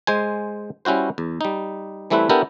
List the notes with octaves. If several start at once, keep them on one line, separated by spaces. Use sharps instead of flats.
G#3 C5 G#5
G3 C#4 E4 F#4 C5
E2
G3 D#4
E3 G3 A3 C4 E4 B4
B3 D4 E4 G4 A4 A#4